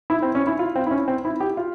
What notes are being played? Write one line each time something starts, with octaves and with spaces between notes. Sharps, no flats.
E4
C4
C#4
E4
F4
C4
E4
C#4
C4
E4
G4
F4